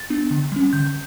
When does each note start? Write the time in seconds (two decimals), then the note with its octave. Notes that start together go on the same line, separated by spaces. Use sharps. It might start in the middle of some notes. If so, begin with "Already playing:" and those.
Already playing: A6
0.10 B3 D4
0.31 D3
0.52 G3 C#4
0.73 D3 G6